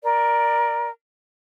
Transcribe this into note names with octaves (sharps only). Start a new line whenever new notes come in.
A#4 D5